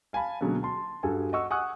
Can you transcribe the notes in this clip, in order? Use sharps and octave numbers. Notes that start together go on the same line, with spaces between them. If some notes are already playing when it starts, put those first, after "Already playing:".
F5 G#5 A5 B5
B2 D3 F#3 G#3 A#3
A5 C6
G2 F#4 G#4 A4 G#5
D#5 F#5 C#6 E6
F#5 G#5 C#6 D#6 E6 F#6